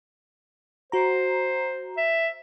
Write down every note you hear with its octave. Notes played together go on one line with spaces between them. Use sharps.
F#4 C5 A#5
E5